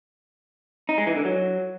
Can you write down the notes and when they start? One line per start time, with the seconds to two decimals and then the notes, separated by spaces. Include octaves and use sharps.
0.89 D#4
0.98 G#3
1.07 E3
1.16 D3
1.25 F#3